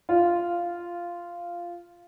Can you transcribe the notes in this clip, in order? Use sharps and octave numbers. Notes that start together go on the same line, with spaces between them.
F4